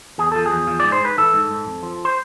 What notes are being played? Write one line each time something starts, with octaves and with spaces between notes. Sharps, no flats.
E2 G#4
F3 A4
G#4
E2
F3
G#2 D5
C5
G#2 B4
E3 A4
G#2
G#2
F2
F3
C5